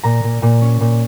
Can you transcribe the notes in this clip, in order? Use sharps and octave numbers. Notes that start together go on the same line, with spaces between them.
A#2 A#5
A#2
A#2
C#4
A#2